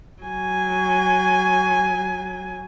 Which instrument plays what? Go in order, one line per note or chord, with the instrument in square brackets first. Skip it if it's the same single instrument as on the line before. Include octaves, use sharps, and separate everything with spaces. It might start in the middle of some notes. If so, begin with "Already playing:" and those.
[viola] F#3 G#5